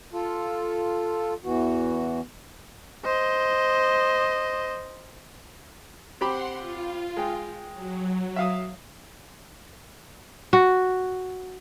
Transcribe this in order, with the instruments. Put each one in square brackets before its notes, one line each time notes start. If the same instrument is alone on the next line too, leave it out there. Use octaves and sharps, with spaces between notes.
[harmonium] F4 A4
E2 E3 F#4
[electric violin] C5 D#5
[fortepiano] C4 G4 B5 [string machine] F#5 C6
[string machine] F4
[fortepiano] G#3 G5
[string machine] F#3
[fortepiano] E5 F5 D#6
[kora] F#4